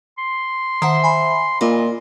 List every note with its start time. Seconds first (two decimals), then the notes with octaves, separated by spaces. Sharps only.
0.18 C6
0.82 D#3 C5 E5 F#5 C7
1.04 G#5 B5
1.61 A#2 F4 D#5